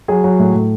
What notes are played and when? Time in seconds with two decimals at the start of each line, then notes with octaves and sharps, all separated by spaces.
0.08 F#3 G#4
0.24 F#3
0.39 A2
0.55 A2